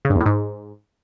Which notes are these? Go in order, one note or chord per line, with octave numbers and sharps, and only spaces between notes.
C#3
G2
E2
A2
G#2